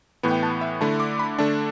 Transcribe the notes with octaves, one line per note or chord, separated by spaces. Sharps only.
A2 E3 B3
G5
A5
E5
D3 A3 E4 A5
D6
B5
D3 A3 D4 A5